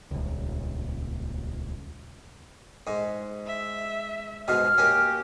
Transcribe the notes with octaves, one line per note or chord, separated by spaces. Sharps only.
D#1 C#2
G#2
E5
G#2 B2 F6
A#3 C#4 G4